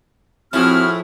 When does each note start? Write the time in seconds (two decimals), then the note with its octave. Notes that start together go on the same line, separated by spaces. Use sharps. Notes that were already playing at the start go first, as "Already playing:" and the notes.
0.53 A2 F3 C4 E4 F#4 G#4 A5 F6